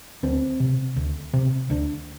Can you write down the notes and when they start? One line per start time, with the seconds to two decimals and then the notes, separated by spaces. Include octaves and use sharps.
0.23 D2 C4
0.60 C3
0.96 D2
1.33 C3
1.70 D2 D4